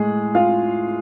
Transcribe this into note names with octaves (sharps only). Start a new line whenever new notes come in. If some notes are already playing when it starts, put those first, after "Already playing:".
Already playing: A2 G#3 G#4
F4 F5